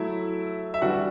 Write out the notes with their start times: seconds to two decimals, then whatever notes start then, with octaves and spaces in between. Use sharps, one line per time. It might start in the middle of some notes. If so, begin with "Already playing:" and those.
Already playing: F#3 A3 E4 E5
0.74 E5
0.82 E3 G3 D4 F#4 F#5